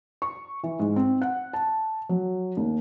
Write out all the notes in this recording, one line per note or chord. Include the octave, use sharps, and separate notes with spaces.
C#6
E3
G#2
C4
F#5
A5
F#3
D#2